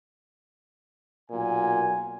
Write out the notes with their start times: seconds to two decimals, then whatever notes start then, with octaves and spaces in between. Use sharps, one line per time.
1.31 B1 A#2 F#4 G#5